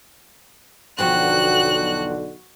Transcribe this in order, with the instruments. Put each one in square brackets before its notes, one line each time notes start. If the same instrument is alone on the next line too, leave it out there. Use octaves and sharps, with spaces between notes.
[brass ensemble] B1 D3 [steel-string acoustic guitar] E2 F3 G5 [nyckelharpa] F#4 [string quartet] F#6